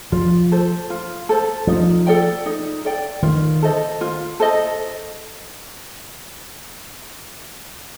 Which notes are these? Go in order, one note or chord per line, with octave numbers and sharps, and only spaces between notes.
F3 F4
A4 C5
F4
A4 C5
F3 D#4
A4 D5 G5
D#4
A4 D5 G5
D#3 F4
A4 C5 D#5
F4
A4 C5 D#5